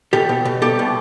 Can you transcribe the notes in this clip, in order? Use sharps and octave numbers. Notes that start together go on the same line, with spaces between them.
B2 G4 A4
B2
B2
C2 G4 A4
B2